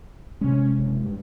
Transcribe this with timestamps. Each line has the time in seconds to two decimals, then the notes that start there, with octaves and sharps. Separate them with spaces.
0.41 C3 G#3 C#4
0.79 F#1
1.05 G2